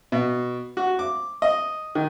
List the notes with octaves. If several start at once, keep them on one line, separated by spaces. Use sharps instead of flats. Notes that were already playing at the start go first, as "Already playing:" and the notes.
B2
F#4
D6
D#5
D#3